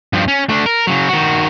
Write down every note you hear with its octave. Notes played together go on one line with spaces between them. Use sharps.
G2 F3
C#4
A3 D4
A#4
C#3 F#3
D#3 F#4